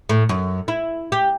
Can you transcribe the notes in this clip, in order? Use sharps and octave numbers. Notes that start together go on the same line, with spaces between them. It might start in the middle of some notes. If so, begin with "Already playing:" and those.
A2
F#2
E4
G4